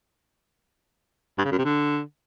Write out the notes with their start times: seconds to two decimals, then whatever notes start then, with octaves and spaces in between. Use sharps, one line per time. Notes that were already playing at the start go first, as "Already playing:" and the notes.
1.38 G2
1.45 C#3
1.51 F#2
1.58 C3
1.65 D3